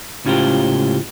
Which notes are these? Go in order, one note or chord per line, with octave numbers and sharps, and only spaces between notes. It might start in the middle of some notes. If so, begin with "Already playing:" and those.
C#2 A2 C#4 F4 G4 C5